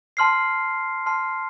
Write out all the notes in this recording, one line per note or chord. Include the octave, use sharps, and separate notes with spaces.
A5 C6 F6 C7
A5 C6 F6 C7